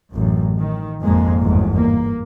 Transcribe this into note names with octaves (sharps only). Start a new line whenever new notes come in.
A1 F#2
D#3
G#1 F2 A#2 G#3 A#3
G1 E2 G#2
A#3